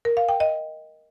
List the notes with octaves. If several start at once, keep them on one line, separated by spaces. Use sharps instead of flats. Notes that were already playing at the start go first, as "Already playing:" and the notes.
A#4
F5
G5
D#5